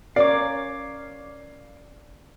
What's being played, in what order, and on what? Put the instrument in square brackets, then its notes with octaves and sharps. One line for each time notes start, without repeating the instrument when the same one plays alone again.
[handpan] C#4 A#4 C#5 [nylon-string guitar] D5 [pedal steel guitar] F5 D6